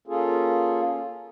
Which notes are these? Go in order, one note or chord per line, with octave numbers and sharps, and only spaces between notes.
A#3 C#4 F4 G#4 A4